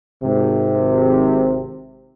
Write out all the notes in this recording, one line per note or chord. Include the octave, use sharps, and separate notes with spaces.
G#1 C3